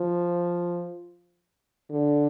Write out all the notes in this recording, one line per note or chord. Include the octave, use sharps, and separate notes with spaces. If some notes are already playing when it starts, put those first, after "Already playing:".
Already playing: F3
D3